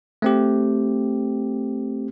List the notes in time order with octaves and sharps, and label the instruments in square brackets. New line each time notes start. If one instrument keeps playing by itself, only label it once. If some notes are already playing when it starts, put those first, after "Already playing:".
[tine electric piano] A3 C4 G4